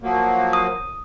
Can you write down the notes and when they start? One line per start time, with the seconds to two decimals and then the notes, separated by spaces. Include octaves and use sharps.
0.02 F3 F#3 A#3
0.53 D#6